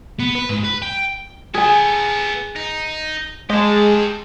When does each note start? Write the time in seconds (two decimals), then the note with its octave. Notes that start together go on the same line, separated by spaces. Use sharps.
0.20 B3
0.35 B4
0.49 G#2
0.64 B4
0.82 G5
1.54 B3 G#4 A4 G#5
2.56 D#4
3.50 G#3 G4 A5